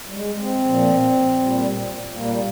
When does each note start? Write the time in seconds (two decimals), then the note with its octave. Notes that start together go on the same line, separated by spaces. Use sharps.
0.08 G3
0.14 G#3
0.39 C4
0.64 A#2 F3
1.39 A#2 G3
2.14 A#2 G3 A#3